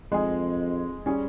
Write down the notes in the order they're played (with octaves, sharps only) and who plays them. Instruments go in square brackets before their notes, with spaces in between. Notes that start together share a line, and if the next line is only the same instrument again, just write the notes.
[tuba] F2 [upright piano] G#3 D#4 G#4
[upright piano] G3 C#4 G#4